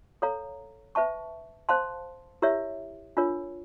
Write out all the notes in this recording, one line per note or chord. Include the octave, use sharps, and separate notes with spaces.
A4 C#5 F5 A#5
B4 E5 A5 C#6
C5 F5 A5 C6
E4 G4 A#4 C#5 E5
D4 F4 A#4 C#5